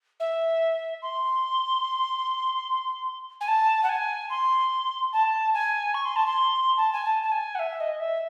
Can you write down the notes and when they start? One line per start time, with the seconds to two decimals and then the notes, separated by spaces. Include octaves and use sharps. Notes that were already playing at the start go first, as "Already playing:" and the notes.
0.20 E5
1.02 C6
3.40 G#5
3.48 A5
3.83 F#5
3.89 G#5
4.30 C6
5.12 A5
5.54 G#5
5.94 C#6
6.05 C6
6.16 A5
6.26 C6
6.77 A5
6.93 G#5
7.05 A5
7.22 A5
7.31 G#5
7.55 F#5
7.59 E5
7.80 D#5
8.00 E5